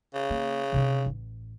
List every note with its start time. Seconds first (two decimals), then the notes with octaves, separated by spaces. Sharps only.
0.14 C#3
0.30 A#3
0.72 C3 D#4
1.06 A1